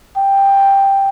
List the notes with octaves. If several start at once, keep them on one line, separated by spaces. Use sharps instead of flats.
G5